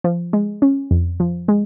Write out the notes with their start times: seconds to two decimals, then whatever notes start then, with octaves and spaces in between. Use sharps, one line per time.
0.04 F3
0.33 G#3
0.62 C#4
0.91 F2
1.20 F3
1.48 G#3